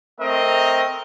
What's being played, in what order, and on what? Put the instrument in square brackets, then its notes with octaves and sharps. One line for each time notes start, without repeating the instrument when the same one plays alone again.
[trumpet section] A3 C4 A#4 D#5